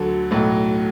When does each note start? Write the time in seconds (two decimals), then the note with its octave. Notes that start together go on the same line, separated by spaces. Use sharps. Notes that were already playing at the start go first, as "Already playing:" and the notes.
Already playing: D2 D3 F#3 A4
0.31 B1 A2 F#3